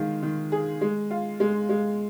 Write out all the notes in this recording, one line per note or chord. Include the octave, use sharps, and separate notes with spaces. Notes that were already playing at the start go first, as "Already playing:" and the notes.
Already playing: D#3 G#3 F4
D#3
G#4
G#3
F4
G#3
G#3